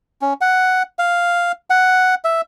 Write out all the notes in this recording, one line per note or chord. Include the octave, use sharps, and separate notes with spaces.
C#4
F#5
F5
F#5
E5